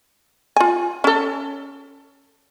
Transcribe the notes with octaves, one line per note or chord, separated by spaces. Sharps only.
F4 G#5
C#4 A4